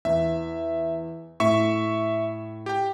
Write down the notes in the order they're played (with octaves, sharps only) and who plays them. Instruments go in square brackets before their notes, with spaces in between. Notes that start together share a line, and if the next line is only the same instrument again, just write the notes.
[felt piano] E2 [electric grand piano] E5
[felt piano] A2 [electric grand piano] E5 C#6
[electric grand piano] G4 G5